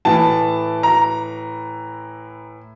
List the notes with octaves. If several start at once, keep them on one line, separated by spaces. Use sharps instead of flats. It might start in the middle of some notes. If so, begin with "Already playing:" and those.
A2 E3 A5
A#5